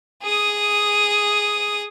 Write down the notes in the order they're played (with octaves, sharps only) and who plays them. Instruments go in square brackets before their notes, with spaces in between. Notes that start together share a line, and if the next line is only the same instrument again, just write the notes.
[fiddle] G#4 D#6